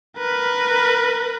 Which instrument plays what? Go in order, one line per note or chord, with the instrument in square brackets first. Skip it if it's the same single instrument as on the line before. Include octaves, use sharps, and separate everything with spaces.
[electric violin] A#4 B4